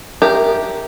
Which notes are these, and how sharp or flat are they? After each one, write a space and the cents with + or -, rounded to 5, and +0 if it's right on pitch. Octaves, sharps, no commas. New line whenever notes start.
G4 -5 A#4 +0 E5 -10